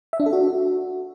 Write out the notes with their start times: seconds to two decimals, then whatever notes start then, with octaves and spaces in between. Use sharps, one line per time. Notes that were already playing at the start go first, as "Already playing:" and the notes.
0.13 E5
0.20 D4
0.26 A4
0.33 F#4